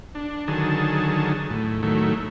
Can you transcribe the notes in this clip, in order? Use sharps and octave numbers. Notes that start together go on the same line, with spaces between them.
D4
D3 D#3 F#3 G#4 A5
A2
A2 D#3 F#3 A3